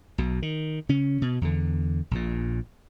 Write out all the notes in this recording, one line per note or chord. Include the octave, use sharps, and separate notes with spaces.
B1 B2
D#3
C#3 C#4
B2
E2 D3
A#1 A#2